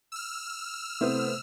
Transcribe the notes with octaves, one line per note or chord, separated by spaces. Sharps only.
E6 F6
C3 A3 B3 E4 C5 D#6